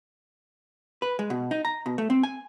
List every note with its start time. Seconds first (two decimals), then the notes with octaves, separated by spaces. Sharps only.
1.02 B4
1.19 G#3
1.30 B2
1.51 D#4
1.65 A#5
1.86 B2
1.98 A3
2.10 C4
2.23 G#5